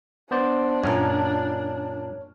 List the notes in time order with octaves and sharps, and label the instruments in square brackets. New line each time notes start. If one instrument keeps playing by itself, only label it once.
[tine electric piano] B3 C5 D5 [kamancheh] D4
[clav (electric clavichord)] F#2 A#2 [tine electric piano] C#5 F6